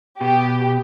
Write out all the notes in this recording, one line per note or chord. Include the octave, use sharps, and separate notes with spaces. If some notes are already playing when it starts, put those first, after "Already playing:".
B2 G4